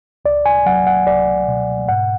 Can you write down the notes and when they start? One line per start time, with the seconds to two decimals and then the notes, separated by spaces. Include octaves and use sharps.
0.25 C#2 D5
0.46 G#5
0.66 F#3 F#5
0.87 F#5
1.07 C#2 D5
1.48 B2
1.89 G#2 F#5